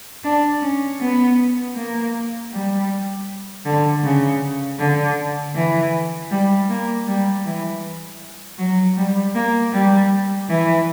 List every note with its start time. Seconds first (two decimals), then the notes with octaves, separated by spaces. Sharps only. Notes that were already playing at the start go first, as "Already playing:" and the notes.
0.24 D4
0.62 C#4
1.00 B3
1.76 A#3
2.52 G3
3.65 D3
4.04 C#3
4.79 D3
5.55 E3
6.31 G3
6.69 A#3
7.07 G3
7.45 E3
8.58 F#3
8.97 G3
9.35 A#3
9.72 G3
10.49 E3